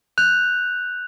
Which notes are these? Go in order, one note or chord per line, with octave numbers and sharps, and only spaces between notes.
F#6 G6 F7